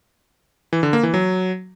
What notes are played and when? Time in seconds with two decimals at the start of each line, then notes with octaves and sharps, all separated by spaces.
0.73 E3
0.83 D3
0.93 A#3
1.03 E3
1.14 F#3